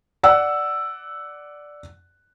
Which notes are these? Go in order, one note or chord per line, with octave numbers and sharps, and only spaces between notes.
D5 F#5 E6